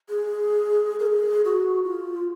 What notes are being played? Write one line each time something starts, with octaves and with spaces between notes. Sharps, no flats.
G#4
A#4
G#4
F#4
F4